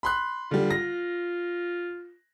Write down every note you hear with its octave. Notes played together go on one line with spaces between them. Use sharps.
B5 C6 F#6
D3 G3 F4
A#6